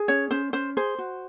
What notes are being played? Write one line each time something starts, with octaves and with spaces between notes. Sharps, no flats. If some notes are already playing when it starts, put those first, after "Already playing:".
Already playing: G#4
C#4 C#5
C#4 C5
C#4 C5
G#4 C5
F#4